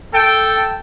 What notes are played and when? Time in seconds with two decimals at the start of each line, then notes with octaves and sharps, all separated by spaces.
0.14 A4 G5